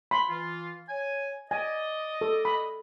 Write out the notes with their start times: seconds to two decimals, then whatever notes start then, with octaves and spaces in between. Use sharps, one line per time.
0.11 B5 C6
0.29 E3 F4
0.89 C#5 G#5
1.51 D5 D#5 G#5
2.21 A4
2.45 B5